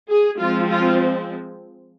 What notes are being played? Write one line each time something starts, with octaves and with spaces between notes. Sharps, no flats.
G#4
F3 G#3 C4 F4
F4